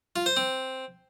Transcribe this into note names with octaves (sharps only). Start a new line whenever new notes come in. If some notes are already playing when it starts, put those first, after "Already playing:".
F4
C5
C4